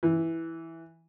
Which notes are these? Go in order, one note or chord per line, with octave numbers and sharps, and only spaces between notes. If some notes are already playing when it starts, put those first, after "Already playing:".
E3